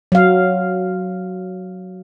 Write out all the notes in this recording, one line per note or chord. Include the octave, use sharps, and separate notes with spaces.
F#3 F5